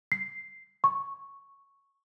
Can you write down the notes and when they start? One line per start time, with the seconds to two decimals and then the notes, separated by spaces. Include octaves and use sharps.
0.12 C7
0.84 C#6